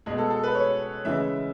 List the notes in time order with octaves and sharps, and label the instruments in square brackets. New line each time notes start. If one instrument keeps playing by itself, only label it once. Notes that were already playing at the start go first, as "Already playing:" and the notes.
[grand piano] B2 G#3 G#4
A4
A4
B4
C#5
C#3 E3 G#3 E5